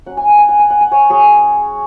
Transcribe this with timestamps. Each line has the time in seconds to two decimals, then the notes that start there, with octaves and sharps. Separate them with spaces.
0.06 F#3 C#4 F#5
0.17 G#5
0.28 F#5
0.38 G#5
0.49 F#5
0.59 G#5
0.70 F#5
0.81 G#5
0.91 C#5 F#5
1.10 F#3 C#4 G#4 C#5